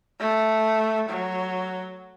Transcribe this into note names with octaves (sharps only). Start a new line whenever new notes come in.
A3
F#3